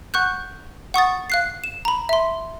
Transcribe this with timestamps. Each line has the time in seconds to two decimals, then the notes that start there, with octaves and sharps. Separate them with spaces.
0.14 F#5 C#6 F#6 G6
0.94 F#5 C#6 D#6 A6
1.30 F5 F#6 C7
1.64 E7
1.85 A#5 B5
2.09 E5 C6